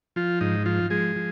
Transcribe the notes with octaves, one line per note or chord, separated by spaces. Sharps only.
F3 F4
G#2 D#4
F3 F4
F3 G#3 G#4
F3